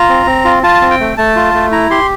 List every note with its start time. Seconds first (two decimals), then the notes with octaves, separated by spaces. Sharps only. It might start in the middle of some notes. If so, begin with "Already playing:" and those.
Already playing: F4 A#5
0.09 C4
0.27 C4
0.45 F4
0.63 F4 A5
0.82 C4
0.91 G5
1.00 A3
1.17 A3 A5
1.36 F4
1.54 A3
1.71 E4 A#5
1.90 G4 C6